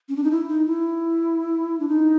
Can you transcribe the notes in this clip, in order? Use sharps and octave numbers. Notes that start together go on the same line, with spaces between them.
C#4
D4
D#4
E4
D#4
E4
D4
D#4